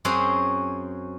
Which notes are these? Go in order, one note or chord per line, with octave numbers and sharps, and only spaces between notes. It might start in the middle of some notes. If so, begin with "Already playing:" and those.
F#2 C4 C#4 F#4 G#4 C6